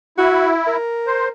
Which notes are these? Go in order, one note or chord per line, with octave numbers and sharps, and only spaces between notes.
E4 F#4
A#4
C5